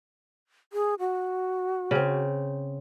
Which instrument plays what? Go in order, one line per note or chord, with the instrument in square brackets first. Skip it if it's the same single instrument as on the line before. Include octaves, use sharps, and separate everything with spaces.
[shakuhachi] G#4
F#4
[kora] C#3 C4